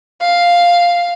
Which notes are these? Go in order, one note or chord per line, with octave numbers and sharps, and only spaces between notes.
F5